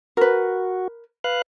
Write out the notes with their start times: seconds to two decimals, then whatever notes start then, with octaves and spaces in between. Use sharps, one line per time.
0.17 F#4 A#4 B4
1.24 B4 F5 F#6